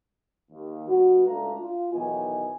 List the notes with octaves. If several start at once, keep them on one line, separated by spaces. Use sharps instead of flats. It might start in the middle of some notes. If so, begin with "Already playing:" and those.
D#2
G2 B2 B3 F#4
C#2 A3 D4 F5 A#5
F4
B1 D#3 E3 B3 D#5 G#5